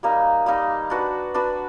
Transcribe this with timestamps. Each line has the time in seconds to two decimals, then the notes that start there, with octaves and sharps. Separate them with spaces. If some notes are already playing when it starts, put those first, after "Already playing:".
0.03 G3 A#3 D#4
0.46 G3 A#3 D#4
0.90 D4 F#4 B4
1.34 D4 F#4 B4